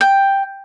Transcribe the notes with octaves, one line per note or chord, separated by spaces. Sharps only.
G5